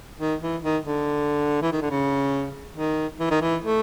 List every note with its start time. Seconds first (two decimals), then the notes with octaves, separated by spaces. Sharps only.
0.20 D#3
0.42 E3
0.62 D#3
0.84 D3
1.62 E3
1.72 D#3
1.82 D3
1.91 C#3
2.77 D#3
3.20 E3
3.31 D#3
3.41 E3
3.63 A3